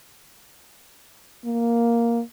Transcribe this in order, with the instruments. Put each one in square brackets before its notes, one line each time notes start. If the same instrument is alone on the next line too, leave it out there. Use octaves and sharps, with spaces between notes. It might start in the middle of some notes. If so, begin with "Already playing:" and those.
[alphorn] A#3